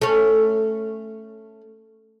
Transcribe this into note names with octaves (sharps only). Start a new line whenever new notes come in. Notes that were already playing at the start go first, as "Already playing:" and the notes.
A3 C#4